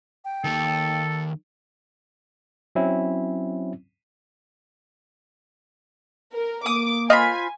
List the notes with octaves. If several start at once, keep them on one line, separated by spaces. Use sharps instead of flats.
G5
D#2 D#3 A4
F#3 C4 C#4 E4
A#4
A#3 D6 D#6
F4 C5 D#5 G#5 B5